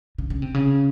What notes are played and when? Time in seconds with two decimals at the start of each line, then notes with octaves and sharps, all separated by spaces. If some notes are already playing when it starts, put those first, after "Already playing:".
0.18 C#3
0.30 C#3
0.42 C3
0.54 C#3